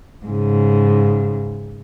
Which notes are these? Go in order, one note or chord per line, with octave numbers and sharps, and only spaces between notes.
G#2 C#3